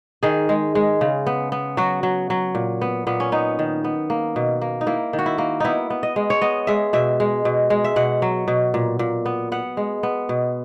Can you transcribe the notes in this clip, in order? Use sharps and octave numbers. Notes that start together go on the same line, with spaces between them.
D#3 G#4
G#3
G#3
C#3
B3
B3
F#3 F#4
F#3
F#3
A#2
B3
A#2 B3
C#4
B3 D#4
D#3
B3
A#3
B2
A#3
D#4
A#3 E4
D#3
F#4
E4
A#3
B3 D#4 E4
B3
D#5
G#3
C#5
B3 D#5
G#3 E5
B2 E5
G#3
B2
G#3
E5
B2 F#5
F#3
B2
A#2
A#2
B3
B3 F#5
G#3
B3
B2